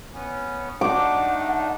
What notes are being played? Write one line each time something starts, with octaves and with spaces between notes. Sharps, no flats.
B3 C#4
A3 D4 D#4 F#5 D6